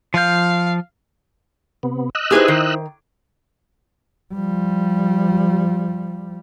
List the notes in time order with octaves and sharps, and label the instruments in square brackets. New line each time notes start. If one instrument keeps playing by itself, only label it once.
[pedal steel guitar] F3 G6 [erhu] F5
[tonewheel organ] C3 B3
D#5 E6 F#6
[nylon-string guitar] D#4 E4 C5 [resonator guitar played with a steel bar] G4 G#4 B4
[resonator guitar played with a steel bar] D#3
[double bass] F3 G3